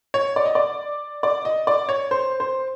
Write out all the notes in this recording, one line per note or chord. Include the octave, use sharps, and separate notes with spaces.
C#5
D5
D#5
D5
D5
D#5
D5
C#5
C5
C5